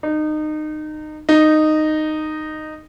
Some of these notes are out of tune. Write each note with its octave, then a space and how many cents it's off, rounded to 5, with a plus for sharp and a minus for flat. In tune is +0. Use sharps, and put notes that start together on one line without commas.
D#4 -25
D#4 -10